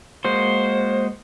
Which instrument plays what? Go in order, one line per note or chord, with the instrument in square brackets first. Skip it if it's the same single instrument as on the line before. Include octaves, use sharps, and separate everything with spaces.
[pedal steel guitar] G#3 A#3 F#4 [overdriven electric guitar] C5